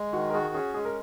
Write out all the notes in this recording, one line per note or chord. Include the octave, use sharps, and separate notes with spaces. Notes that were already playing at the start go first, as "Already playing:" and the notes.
Already playing: G#3
D#3 F#4
A#4
F#4 G#4
C#4 G#4
G#3 G#4
A#4